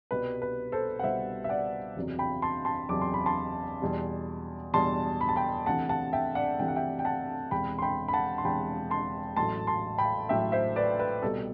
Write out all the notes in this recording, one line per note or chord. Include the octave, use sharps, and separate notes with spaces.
C2 B2 G3 B4
B4
A4 C5
F#5
C2 B2 G3 C5 E5
E5
D5 F#5
F#1 E2 C3 F#3
G5 B5
A5 C6
A5 C6
F#1 E2 C3 F#3 D6
C6
B5
A5 C6
E2 B2 G3
E2 B2 G3 A5 C6
B5
A5
G5 B5
D2 C3 E3 F#5 A5
F#5 A5
E5 G5
D5 F#5
D2 C3 E3 G5
F#5
E5 G5
G5
F#5 A5
E1 E2 C3 G5 B5
C6
G5 B5
B5
F#5 A5
C6
E1 E2 C3 G5 B5
A5 C6
A1 A2 F#3 A3 A5 C6
A5 C6
G5 B5
A1 A2 F#3 A3 E5 G5
C5 E5
B4 D5
B4
C2 B2 G3 A4